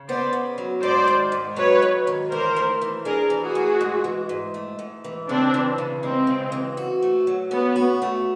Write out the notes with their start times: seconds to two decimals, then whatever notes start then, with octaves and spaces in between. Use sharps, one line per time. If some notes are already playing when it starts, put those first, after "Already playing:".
Already playing: C#3
0.08 B3 C5 D5
0.33 C#3
0.58 F#3
0.82 G#2 C5 D5
1.08 D#3
1.32 G#2
1.56 F#3 B4 C#5
1.82 G#2
2.07 D#3
2.31 E3 A#4 C5
2.56 A3
2.81 E3
3.05 D4 G#4 A#4
3.30 E3
3.42 F#4 G#4
3.55 A3
3.81 G#2
4.04 E3
4.29 G#2
4.54 A3
4.79 G#2
5.04 E3
5.28 C#3 C4 D4
5.54 E3
5.78 C#3
6.03 G#3 C4
6.27 C#3
6.52 E3
6.77 F#4
7.02 A3
7.27 F#3
7.51 B3 C#4
7.76 F#4
8.02 A3